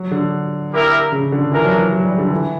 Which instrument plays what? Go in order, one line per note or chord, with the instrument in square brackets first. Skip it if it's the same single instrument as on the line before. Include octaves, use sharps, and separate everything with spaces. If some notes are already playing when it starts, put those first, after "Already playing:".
Already playing: [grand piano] F#3
D3
[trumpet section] A#3 E4 G4 A#4 E5
[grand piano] C#3
D3
[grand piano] E3 [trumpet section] A#3 D4 A#4
[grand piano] F#3
E3
F#3
G3
D3
E3